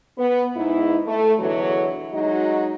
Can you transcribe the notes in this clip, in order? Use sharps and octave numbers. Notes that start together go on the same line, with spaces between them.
B3
G#2 D#4 E4
A3
E2 B2 D3 E3 F#3
F#3 G#3 D#4 F#4 D#5